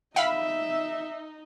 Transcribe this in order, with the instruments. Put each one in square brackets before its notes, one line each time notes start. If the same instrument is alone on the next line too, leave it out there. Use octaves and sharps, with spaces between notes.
[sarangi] D#4 [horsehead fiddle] E5 [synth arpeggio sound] F5 B5